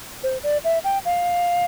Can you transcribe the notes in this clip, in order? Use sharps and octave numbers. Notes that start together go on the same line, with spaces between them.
C5
D5
E5
G5
F5